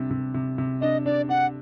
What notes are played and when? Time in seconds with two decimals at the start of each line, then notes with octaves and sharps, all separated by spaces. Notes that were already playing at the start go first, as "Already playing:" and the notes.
Already playing: C3 G3 D4
0.10 C3
0.34 C3
0.58 C3
0.81 D4 D#5
1.05 D4 D5
1.29 D4 F#5